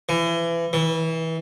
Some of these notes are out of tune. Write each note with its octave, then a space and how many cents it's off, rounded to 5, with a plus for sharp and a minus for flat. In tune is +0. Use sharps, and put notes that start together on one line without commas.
E3 +30
E3 -25